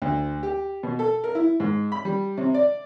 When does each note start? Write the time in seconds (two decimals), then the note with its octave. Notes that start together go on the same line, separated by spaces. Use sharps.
0.02 D2
0.43 G4
0.83 B2
0.99 A4
1.24 A#4
1.35 E4
1.60 G#2
1.92 B5
2.05 G3
2.38 C3
2.54 D5